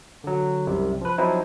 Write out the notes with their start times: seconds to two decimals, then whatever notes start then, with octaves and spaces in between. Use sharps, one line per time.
0.24 D3 F#3
0.67 C2 F#2 C3 G3
1.01 F3 B4
1.18 F3 F#3 C4 D#4 E4